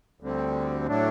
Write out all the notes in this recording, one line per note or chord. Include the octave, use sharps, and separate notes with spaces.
D2 D3 G3 C4
A2 F#3 A3 D4